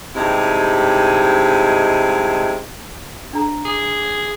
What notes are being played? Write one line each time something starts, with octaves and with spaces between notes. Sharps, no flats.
G2 C3 G#3 D#4 E4
D4 A#5
G#4